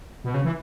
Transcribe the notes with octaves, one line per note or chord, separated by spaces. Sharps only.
B2
C#3
E3